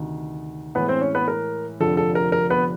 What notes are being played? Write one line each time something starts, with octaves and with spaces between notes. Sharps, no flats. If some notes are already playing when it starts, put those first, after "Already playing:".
Already playing: D2 C3 D#3
A2 E3 G#3 B3 B4
C4 C5
C#4 C#5
B3 B4
A#4
F1 F2 D3 F3 A4
A4
A#4
A#4
B3 B4